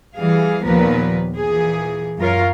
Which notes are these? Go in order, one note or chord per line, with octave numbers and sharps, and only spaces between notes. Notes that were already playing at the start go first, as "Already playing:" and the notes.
E3 G3 G#4 F5
D#2 A#2 F3 B3 A#4 B4
A#2 E3 G#4
F#2 F4 A#4 C#5 F5